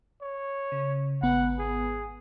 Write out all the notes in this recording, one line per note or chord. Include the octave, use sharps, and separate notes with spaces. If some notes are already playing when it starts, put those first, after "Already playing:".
C#5
C#3
G#1 B3 F#5
G#4